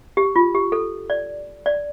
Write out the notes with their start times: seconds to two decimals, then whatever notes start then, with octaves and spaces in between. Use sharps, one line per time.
0.17 G4
0.36 F4
0.55 G4
0.72 A4
1.10 D5
1.66 D5